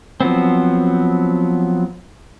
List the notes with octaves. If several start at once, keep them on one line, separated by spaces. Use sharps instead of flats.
F3 F#3 B3 C4